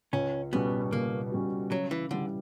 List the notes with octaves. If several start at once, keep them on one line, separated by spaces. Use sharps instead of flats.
C#2 C#4
B2 G3 B3 C#4 F#4
C#2 A#3
B2 G3 C#4 F#4
C#3 F#3
E3
D3 E3 G3